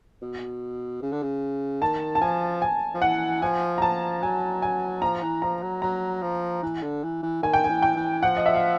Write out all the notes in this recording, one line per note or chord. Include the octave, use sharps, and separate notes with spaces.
B2
C#3
D3
C#3
D#3 A5
A5
F3 G#5
G#5
F3
E3 F#5
F3 G#5
A#5
F3 A5
F#3 G#5
G#5
F3 A#5
E3
F3 A#5
F#3
F#3 A#5
F3
E3
D3
E3
E3
D#3 G#5
G5
G#5
E3
G5
E3
F3 F#5
D#5
E5
F5